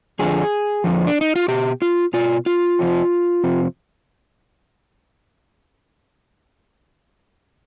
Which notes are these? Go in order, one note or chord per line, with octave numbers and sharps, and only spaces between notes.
F2 D3 F3 G#4
F2 D3 F3
D4
D#4
F4
B2 G4
F4
B2 F4
F4
F2 C3 F3
F2 C3 F3